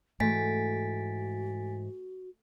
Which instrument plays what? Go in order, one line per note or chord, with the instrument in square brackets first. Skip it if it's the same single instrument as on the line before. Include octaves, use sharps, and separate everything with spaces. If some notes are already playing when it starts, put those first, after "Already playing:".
[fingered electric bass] G#2 E3 [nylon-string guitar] A3 [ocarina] F#4 [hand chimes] G#5 A6 B6